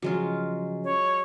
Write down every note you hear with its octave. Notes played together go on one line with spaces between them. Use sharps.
C#3 F3 F#3 G#3 C#4 F4
C#5